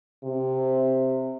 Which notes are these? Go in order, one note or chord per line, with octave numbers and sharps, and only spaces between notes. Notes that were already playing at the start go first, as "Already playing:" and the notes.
C3